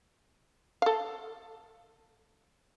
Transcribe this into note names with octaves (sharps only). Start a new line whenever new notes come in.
A4 F5